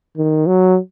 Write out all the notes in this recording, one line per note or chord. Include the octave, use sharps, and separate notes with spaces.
D#3
F#3